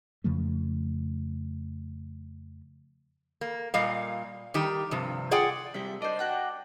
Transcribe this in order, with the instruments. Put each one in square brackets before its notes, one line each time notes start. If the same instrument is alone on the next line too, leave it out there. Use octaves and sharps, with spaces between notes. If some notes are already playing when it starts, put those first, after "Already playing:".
[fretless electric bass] F2 C#3 F3 A3
[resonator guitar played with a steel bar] A#3
A#2 G3 D#5 F5
D#3 G3 G4
G2 C3 F3
F4 G#4 D5 F#5 G5
[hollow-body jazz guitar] C3 G3 G4 [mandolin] E5
[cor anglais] D4 [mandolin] C5 D5 [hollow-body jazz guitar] D#5
[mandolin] F#4 F#5 G5